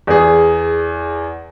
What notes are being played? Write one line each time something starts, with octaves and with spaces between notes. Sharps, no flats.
E2 G#4